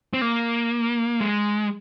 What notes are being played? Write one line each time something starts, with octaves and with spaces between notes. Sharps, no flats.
C4
A#3
G#3